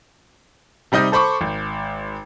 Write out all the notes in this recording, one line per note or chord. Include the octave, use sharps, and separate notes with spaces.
C3 G3 D#4 D#5 G6
A4 C5 B5 C#6 D6
G#1